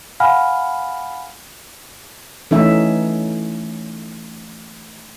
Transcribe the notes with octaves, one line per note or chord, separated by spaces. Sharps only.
F5 F#5 G#5 B5 F6
E3 A3 C#4 D#4 E5